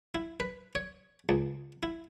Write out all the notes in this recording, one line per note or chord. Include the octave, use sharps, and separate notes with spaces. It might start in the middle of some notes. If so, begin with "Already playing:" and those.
E4
B4
C#5
C#2
E4